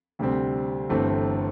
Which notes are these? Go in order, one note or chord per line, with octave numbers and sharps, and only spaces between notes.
D2 C3 G3 C4
G1 G2 E3 A3 C4